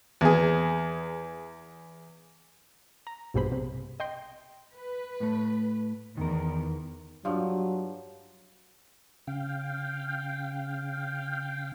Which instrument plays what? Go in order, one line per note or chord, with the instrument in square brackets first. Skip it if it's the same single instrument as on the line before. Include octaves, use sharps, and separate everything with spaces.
[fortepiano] E2 G#4
[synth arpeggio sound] A#5
A#1 G2 B2 G#4 C5 B5
C3
D#5 G5 C6
[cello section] B4
[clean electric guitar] A2 A3
[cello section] E2 [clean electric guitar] D#3 A#4
[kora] G2 F3 [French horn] F#3
[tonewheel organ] C#3 F5 G5